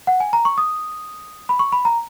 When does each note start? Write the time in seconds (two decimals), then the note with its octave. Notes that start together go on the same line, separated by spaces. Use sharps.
0.07 F#5
0.20 G#5
0.33 A#5
0.45 C#6
0.58 D#6
1.49 B5
1.59 C#6
1.72 B5
1.85 A#5